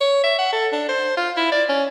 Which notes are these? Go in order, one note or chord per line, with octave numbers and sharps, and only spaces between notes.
C#5
E5
F#5
A4
D4
C5
F4
E4
D5
C#4